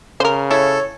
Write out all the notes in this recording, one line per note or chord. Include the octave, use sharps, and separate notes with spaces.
C#3 A#4 C5
E4 A4 C#5